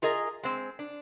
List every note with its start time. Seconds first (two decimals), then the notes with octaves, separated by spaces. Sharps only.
0.02 F4 G#4 A#4 D#5
0.43 G#3 C4
0.79 D4